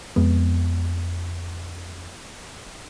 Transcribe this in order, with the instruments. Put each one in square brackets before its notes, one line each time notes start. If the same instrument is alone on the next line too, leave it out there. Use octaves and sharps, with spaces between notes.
[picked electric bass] F2 G#3 B3